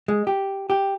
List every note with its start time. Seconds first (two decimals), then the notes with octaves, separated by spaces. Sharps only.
0.08 G#3
0.27 G4
0.70 G4